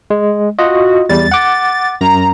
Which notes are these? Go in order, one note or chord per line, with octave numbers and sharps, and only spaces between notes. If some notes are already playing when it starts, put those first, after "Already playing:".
G#3
F4 F#4 D#5
E2 G3 A6
F#5 D6
F#2 A#5